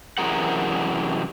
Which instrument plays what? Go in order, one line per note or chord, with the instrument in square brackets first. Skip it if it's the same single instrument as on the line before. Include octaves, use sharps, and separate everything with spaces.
[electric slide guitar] F#2 C3 E3 G#4 A#4 F#5